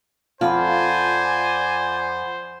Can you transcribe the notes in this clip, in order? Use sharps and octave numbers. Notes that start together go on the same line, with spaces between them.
F2 F4 C5 D5 F#5 G#5 B5